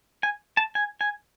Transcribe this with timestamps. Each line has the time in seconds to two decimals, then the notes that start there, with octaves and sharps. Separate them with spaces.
0.23 G#5
0.57 A5
0.75 G#5
1.01 G#5